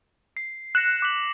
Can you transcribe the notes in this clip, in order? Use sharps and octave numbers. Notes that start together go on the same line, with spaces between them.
C7
F#6 A#6 C#7 E7
D6 B6 F#7